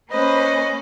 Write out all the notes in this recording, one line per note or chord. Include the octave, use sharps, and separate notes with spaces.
A#3 C#4 B4 C5 D#5